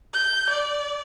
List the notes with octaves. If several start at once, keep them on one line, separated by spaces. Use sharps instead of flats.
G6
D5